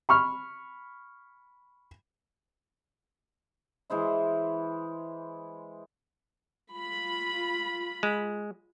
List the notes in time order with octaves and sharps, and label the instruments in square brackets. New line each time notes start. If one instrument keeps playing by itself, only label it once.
[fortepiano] B5 C#6 F6
[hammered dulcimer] E3 G#3 C5 E5
[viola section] F4 B5
[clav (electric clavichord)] G#3